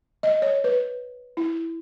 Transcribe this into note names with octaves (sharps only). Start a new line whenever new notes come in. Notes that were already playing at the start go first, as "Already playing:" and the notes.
D#5
C#5
B4
E4